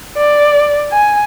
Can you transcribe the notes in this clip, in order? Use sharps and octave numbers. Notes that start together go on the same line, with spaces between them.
D5
G#5